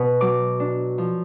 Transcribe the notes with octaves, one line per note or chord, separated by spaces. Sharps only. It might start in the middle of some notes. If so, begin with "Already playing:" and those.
Already playing: B2
F#3 D6
D4
F3